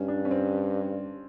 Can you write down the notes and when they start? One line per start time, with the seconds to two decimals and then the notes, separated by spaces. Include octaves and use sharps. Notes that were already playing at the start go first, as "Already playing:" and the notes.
Already playing: G2 C#4
0.08 D4
0.25 C#4
0.31 C4